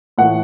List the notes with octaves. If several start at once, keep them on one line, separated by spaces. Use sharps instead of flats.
A2 E3 A3 F#5